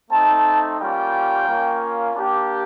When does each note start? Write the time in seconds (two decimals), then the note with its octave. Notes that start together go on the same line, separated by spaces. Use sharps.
0.11 A3 C4 D#4 A5
0.79 G3 A#3 C#4 F4 G5
1.47 A#3 C#4 F4
2.16 A#3 D4 G4